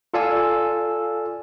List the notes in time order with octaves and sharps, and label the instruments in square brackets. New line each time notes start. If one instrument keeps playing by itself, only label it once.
[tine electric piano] F4 A4 D5 F5 G#5 E6